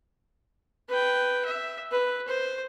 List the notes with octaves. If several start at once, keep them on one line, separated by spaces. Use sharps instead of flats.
B4 G5
E5
B4
C5